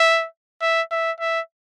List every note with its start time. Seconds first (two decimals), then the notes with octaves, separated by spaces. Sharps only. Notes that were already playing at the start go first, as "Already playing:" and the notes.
Already playing: E5
0.62 E5
0.91 E5
1.20 E5